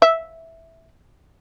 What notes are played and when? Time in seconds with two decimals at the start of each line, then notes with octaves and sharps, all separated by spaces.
0.02 E5